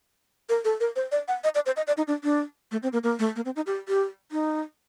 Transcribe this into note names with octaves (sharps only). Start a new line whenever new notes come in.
A#4
A4
A#4
C5
D5
F#5
D#5
D5
C5
D#5
D5
D#4
D4
D4
A3
C4
A#3
A#3
A3
A#3
C4
D#4
G4
G4
D#4